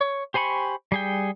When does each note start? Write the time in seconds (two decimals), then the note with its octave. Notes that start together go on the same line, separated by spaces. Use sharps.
0.01 C#5
0.34 G4 C5 G#5 B5 C#6
0.92 G3 G#4 G5